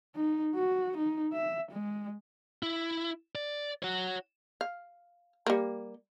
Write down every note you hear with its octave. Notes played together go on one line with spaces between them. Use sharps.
D#4
F#4
D#4
E5
G#3
E4
D5
F#4 C#5
F5
G3 A#3